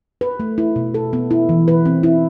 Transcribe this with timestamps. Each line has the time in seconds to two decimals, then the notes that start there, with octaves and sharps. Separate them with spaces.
0.21 B4
0.40 A3
0.58 E4
0.76 B2
0.94 A4
1.13 B3
1.31 E4
1.49 E3
1.68 B4
1.86 C4
2.03 E4